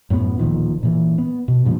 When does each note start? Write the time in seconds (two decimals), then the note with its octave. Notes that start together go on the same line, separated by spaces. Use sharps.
0.10 F#2 A2 C3 B3
0.38 D1 A#2 D#3 F3
0.83 A#2 E3
1.18 B3
1.48 B2
1.65 G2 A#2 F3